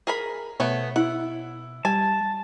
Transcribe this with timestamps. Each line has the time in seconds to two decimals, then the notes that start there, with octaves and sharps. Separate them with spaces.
0.07 G#4 A#4 B5
0.60 B2 A3 B3 C#5
0.96 E4 F#5
1.85 G3 G#5 A5